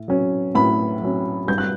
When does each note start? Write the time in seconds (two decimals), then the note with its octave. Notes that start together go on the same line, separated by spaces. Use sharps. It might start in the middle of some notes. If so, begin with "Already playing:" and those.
Already playing: A2
0.08 F#3 C#4
0.55 A2 B5
1.02 F#3 C#4
1.48 G2 G6
1.58 F#6